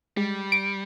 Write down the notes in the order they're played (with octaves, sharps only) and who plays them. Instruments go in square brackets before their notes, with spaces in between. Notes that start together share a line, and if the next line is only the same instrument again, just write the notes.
[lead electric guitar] G3 [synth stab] G#3
[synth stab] D7